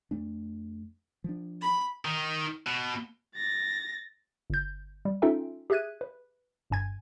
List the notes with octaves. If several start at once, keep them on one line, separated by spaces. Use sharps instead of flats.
F2 A3 D4
F3 D4
B5
D#3
B2
A6 A#6
G1 G6
G3
C#4 D#4 F4 A4 E5 G5
G4 G#4 E5 F#6 G#6 D#7
B4
G1 G2 G#5 G#6